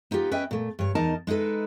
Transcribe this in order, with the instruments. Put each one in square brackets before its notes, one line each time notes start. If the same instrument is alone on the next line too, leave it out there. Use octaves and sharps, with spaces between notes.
[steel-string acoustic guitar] B3 D#4 F4 G4
C#4 B4 D#5 E5 G5
A#2 A3
G2 C#5
E2 D#4 A#4 D#5 A5
G#3 D#4 E4 A4 B4